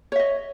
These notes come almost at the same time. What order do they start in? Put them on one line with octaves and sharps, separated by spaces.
C#5 E5 D#5